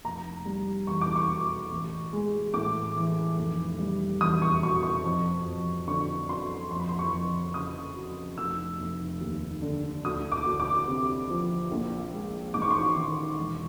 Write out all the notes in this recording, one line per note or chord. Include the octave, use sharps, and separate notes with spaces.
F1 A#5
G3
E2 C#6
D6
C#6
B2
A1
G#3
A2 D6
E3
F1
G3
E2 D#6
C#6
B2 C#6
C#6
F2
F2
D3 C#6
F#3 C6
F2 C6
B5
C6
C#6
F2
C#3 D#6
F#3
F1 E6
F1
D#2
D3
D2 D#6
D6
D2
D6
C3
F3
A#1
G#3
G#2 D6
C#6
C6
C#6
D#3
E1